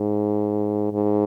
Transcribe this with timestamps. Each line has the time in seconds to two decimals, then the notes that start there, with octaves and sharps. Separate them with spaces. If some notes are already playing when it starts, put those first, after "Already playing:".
Already playing: G#2
0.93 G#2